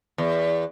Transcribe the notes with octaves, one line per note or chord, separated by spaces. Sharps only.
E2